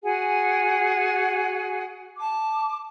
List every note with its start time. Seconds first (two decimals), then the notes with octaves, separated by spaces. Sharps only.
0.02 F#4 G#4 F#5 G#5
2.18 A5 D6